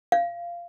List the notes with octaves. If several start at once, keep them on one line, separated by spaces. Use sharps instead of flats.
F5